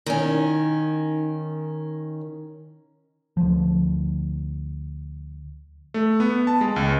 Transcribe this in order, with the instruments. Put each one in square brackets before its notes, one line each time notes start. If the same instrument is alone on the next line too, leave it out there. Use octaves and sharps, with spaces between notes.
[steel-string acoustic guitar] D#3 C#4
[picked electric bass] D2 F3
[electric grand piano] A3
B3
A5
G#3
C#2